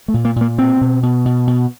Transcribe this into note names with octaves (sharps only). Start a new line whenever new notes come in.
A3
A#2
A#3
A#2
A#3
B2 C4
B2
B2
B2
B2